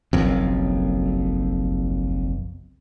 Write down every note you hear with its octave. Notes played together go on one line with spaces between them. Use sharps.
F#1 B1 F2